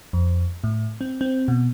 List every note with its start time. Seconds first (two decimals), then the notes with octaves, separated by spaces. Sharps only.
0.13 F2
0.64 A2
1.01 C4
1.21 C4
1.48 B2